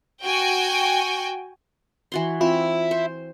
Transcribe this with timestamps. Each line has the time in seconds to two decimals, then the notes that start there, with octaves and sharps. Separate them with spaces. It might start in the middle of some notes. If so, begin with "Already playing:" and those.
0.24 F#4 G5 G#5
2.12 E3 F#4 C6
2.41 C4 E4 F4
2.91 C5